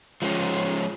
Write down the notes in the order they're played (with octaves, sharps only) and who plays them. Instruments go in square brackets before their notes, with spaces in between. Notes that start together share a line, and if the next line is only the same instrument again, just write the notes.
[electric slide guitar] F3 G#3 B3 C#4